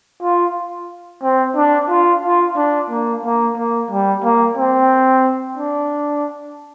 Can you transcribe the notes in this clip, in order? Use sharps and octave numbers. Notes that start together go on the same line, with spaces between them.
F4
C4
D4
F4
F4
D4
A#3
A#3
A#3
G3
A#3
C4
D4